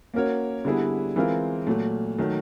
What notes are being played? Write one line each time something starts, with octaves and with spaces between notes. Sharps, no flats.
A#3 C#4 F#4 A#4 C#5
D3 G3 B3 E4 G#4
E3 G#3 C4 F4 A#4
A#2 F#3 A3
D#3 F#3 A3